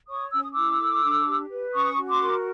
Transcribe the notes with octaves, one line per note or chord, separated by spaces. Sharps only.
C#5 C#6 D#6
C#4 E6
D#6
E4 D6 E6
A4
D4
G4
B4
C#4 C#6 D#6
F#4
C6 D6
A#4